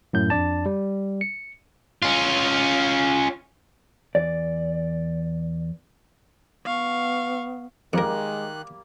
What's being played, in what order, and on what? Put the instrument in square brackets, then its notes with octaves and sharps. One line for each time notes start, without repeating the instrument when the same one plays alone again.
[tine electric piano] F#2 A2 G6
F2 D4 D5 A5
G3
C#7
[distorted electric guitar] C#4 F4
[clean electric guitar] E2 D5
[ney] B3 [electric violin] F5 C#6
[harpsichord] F2 A#4 [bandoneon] D#3 F#6 [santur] G3 A#3 [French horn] G#3